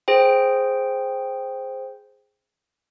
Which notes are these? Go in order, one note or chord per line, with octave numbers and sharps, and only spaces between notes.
G#4 C5 G5